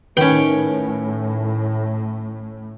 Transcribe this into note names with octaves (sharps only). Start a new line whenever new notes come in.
A2 D#3 C#4 B4 G5